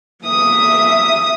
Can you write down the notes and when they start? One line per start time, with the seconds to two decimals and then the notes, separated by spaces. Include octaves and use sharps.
0.25 A#3 E5 D#6